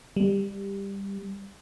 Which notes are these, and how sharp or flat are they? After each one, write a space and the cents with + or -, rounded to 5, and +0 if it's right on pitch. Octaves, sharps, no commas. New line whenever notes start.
G3 +10